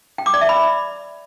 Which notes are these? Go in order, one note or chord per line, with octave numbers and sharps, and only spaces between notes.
G5
D6
D5
E5
B5